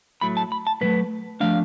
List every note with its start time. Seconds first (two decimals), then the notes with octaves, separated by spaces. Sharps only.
0.21 A2 F#3 A3 B5
0.37 A5
0.52 B5
0.67 A5
0.81 A2 F#3 A3 B4
1.40 F3 A3 D4 F5